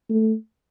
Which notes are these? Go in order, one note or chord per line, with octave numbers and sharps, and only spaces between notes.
A3